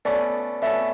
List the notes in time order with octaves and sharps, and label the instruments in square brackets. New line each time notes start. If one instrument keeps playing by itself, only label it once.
[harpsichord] B2 A3 C#4 [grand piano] D5
[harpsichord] B2 A3 C#4 [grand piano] E5